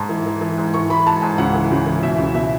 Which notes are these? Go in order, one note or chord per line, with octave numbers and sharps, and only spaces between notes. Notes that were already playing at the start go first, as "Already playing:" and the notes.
Already playing: G#2 A5
E3
E3
E3
G#2
E3 C#6
E3 B5
G#2 A5
G#2 G#5
C#2 F#5
E3
C#2
E3
B2 E5
C#2
B2 E5